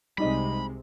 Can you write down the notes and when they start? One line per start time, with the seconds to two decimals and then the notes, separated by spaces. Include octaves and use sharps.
0.18 C2 C3 G3 G#3 D#4 D#5 B5